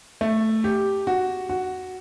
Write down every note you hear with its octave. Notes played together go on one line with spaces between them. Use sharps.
A3
G4
F#4
F#4